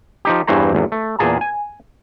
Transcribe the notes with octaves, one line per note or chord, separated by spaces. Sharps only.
F3 D#4 G4
E2 G2 E3 C5 C#5 A#5
G#1 E2
A3
E2 A#2 G#4 A5 A#5
G#5